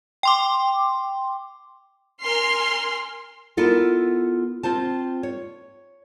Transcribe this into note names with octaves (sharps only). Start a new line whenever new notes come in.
G5 C6 D6
A#4 G#5 C6 F6
B3 E4 F4 A4 A#4
C4 F4 C5 A5
C#5